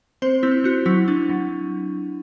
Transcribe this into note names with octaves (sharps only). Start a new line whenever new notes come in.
C4 C5
C4 E4
C4 F#4
F#3 E4
D4
F#3